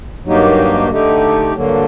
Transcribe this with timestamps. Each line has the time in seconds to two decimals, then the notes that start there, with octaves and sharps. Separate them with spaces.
0.25 G2 F#3 A#3 D#4 G4
0.89 D3 A3 D#4 G4
1.54 G2 D3 F#3 A#3